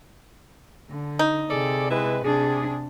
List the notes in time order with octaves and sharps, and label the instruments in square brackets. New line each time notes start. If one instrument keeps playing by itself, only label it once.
[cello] D3
[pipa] D#4
[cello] C3 [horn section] G#4 A4 D5
[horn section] G#3 E4 B4
[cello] C3 D4 [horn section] G#4